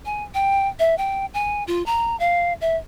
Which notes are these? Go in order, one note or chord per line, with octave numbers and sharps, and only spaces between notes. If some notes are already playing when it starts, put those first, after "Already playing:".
G#5
G5
E5
G5
G#5
F4
A#5
F5
E5